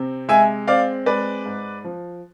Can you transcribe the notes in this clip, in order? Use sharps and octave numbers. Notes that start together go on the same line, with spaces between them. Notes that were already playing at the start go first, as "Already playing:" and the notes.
Already playing: C3 C4
G#3 E5 G#5
C4 D5 F5
G#3 B4 D5
G#2
F3